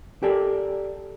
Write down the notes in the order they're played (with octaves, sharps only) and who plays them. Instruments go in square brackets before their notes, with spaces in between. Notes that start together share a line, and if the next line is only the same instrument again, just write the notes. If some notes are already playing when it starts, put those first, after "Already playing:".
[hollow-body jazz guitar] G4 A4 A#4 D5 G#5